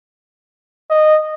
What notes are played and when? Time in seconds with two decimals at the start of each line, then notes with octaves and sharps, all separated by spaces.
0.90 D#5